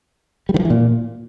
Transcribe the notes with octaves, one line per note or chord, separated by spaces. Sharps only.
G3
D#3
F3
E3
A#2